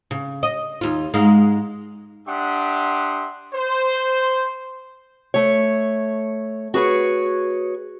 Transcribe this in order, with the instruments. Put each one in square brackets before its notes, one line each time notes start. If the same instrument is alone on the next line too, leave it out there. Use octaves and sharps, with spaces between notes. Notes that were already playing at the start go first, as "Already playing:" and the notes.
[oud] C#3
D#5
D#2 F4
G#2 G#3 F5
[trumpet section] D4 G4 E5 F#5 C6 D#6
C5
[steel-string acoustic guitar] A3 C#5
F#4 G#4 B4 C#5